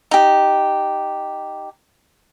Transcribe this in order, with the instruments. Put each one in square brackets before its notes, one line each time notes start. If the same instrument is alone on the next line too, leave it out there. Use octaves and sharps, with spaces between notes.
[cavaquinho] D#4 G4